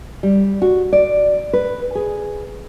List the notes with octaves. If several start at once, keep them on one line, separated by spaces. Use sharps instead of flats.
G3
F#4
D5
B4
G#4